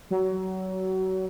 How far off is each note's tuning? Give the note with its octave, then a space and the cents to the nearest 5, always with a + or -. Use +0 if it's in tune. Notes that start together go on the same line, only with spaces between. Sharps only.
F#3 +25